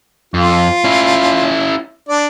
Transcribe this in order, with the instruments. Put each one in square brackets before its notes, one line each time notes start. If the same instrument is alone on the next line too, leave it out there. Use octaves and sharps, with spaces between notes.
[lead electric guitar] F2 [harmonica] F4
[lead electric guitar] C#4 E4
[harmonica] D4 D5